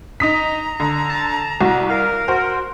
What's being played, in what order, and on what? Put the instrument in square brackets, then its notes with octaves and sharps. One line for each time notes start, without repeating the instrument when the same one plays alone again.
[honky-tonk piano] D#4 D#6 B6 [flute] A#5
[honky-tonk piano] D3
[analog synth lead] A5
[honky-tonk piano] C2 [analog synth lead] F#4
[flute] A#4 [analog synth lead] F5
[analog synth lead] F#4 [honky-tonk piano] C5